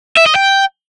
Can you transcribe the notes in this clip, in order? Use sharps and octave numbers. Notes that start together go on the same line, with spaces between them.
E5
D#5
G5